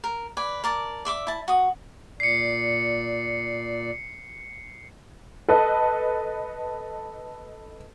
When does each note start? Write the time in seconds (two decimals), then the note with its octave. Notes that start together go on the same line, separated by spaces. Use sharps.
0.04 A#4
0.37 B4 D5 G#5
0.64 A#4 D5 A5
1.05 D5 E5 C6 D6
1.27 E4 A5
1.48 F#4 D#6
2.20 A#2 D5 C7 C#7
5.48 A4 B4 D#5